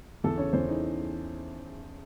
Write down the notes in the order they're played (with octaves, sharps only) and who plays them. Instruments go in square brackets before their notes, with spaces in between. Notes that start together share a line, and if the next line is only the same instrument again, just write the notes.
[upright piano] E2 A4
C#3 C#5
E2 C5
E3 D#4